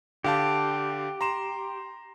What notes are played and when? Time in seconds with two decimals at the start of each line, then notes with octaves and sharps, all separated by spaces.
0.24 D3 G4 F5 A5
1.21 A#5 C6 E7